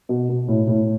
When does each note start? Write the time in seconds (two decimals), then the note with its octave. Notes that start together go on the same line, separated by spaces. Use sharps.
0.09 B2
0.29 B2
0.48 A2
0.68 A2